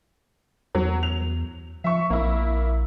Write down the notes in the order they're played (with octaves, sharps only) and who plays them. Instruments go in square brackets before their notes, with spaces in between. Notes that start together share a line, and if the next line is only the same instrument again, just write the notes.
[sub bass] E2 [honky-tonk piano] F#3
[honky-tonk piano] F7
[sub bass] F3 [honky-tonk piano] E5 C#6
[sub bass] A#1 [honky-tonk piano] A#3 E4